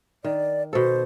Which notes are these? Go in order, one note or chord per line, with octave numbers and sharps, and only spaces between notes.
D#3 D5
B2 A4 C5